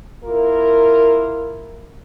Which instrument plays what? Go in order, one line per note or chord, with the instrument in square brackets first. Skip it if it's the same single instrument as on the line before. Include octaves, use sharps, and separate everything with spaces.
[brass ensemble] A#3 E4 F4 A#4